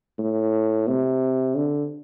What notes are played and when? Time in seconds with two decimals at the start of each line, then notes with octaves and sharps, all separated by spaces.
0.19 A2
0.88 C3
1.56 D3